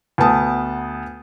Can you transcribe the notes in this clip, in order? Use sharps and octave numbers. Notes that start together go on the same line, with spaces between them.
D2 B3 A5 D#6